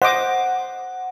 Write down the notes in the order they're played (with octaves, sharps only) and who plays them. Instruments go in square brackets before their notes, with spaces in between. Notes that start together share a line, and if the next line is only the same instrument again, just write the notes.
[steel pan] C5 D#5 D6 [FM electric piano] F#5